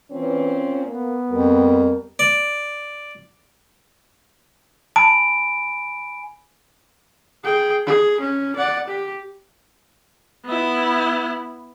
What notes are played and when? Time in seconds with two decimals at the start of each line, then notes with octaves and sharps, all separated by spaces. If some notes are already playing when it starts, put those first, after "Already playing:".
0.11 A#2 E3 C4 C#4
0.86 A#3 B3
1.31 F2 G3 A#4
2.19 D5
4.96 G#5 A5 B5 D7
7.44 G#4 G5
7.86 G#4
8.20 C#4
8.56 D5 F#5
8.87 G4
10.45 B3 E4